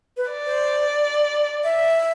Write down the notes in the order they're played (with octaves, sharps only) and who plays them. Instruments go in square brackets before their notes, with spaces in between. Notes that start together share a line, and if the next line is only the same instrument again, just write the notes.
[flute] B4
[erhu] D5
[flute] C5
E5